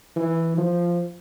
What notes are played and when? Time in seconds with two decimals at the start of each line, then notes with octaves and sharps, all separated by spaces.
0.16 E3
0.58 F3